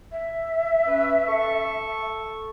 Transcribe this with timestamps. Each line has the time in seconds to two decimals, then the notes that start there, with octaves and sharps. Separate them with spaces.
0.12 E5
0.87 C#4 B4
1.29 A4 C#6